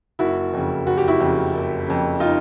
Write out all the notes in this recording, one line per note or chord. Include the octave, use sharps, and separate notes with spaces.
F#1 E4 F#4
F2 C#3
F#1 F#4
G4
E4 F#4
F2 C#3
F#1
F2 C#3
D#4 F4